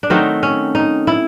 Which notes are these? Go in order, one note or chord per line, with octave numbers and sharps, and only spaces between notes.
D4
D#3 F#3 A3 C4 D#4
C#4
D#4
E4